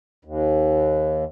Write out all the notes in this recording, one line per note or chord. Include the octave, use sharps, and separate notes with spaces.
D#2